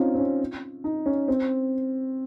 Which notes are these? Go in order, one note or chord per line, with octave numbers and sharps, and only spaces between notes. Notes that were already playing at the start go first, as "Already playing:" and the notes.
Already playing: C4 C#4 D#4 F4
C4
C#4
D#4
C#4
C4